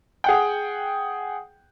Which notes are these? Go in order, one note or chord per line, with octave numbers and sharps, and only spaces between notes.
G#4 F#5 G5